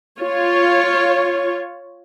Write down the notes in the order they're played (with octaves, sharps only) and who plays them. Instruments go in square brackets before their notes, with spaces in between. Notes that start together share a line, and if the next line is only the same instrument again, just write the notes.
[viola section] F4 C#5